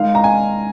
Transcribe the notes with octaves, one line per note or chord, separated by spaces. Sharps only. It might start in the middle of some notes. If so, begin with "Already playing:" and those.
Already playing: D#3 G#3 D#4 F5
A#5
G#5